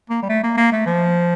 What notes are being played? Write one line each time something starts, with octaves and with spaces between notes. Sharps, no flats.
A#3
G3
A3
A#3
A#3
A3
F3